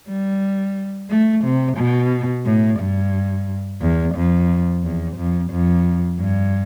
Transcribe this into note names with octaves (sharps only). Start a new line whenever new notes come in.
G3
A3
C3
B2
A2
G2
E2
F2
E2
F2
F2
G2